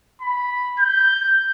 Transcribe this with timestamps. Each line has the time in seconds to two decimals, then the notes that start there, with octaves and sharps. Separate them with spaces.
0.21 B5
0.79 G6